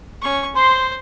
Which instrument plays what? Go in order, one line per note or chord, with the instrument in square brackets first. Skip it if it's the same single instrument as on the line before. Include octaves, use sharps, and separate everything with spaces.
[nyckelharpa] C#4 C#6
[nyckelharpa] C5 [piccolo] C6